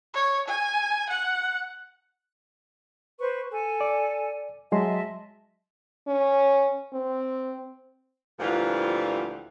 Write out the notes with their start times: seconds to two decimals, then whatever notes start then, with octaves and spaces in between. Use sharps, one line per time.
0.14 C#5
0.48 G#5
1.09 F#5
3.19 B4 C5 C#6
3.51 A4 G#5
3.81 D5
4.72 F#3 G#3 D#5 E5 A5 C6
6.08 C#4
6.93 C4
8.40 D2 A#2 E3 F3 G3 F4